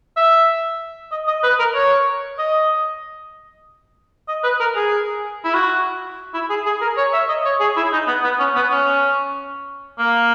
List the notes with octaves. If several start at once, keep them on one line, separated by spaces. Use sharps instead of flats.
E5
D#5
D#5
B4
A#4
C#5
D#5
D#5
B4
A#4
G#4
E4
F#4
E4
G#4
G#4
A#4
C#5
E5
D#5
C#5
G#4
E4
D#4
B3
B3
C#4
B3
C#4
A#3